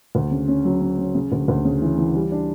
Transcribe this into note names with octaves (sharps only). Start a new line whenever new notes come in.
D2
C#3
C#4
F#3
C#4
C#4
C#3
D2
D2
C#3
E3
E3
G3
D4